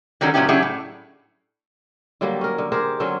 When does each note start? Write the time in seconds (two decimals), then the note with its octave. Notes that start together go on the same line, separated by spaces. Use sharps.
0.21 D3 D#3 F#3 G3 C#4
0.34 A#2 F#3 B3 C#4 E4 G4
0.49 F#3 C#4 D4 E4 G4 G#4
0.62 A2
2.21 D3 F#3 G3 A#3
2.41 C#4 A#4
2.58 D3
2.72 G4 G#4 A#4 C5
3.00 D3 F#3 C4 C#4